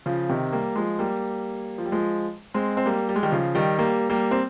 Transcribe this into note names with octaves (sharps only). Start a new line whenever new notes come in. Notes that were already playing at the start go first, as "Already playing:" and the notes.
C#3 F3
C3 D#3
G3 A#3
F3 G#3
G3 A#3
F3
G3
F3 G#3
G#3 C4
C4
G3 A#3
G3
G#3
D#3 G3
C#3 F3
D#3 G3
G3 A#3
G3 A#3
C4